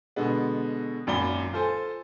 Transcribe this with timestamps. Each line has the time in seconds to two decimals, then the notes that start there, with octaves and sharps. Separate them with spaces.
0.16 B2 D3 G#3 B3
1.07 G#1 F#2 A#2 D5 B5 G7
1.53 F4 A4 C5 G#5